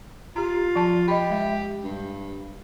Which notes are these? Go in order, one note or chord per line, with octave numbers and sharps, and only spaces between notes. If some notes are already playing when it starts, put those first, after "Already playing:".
F4 G4 A#5
F3 A5
G4 D#5 B5
G#3 E5
G2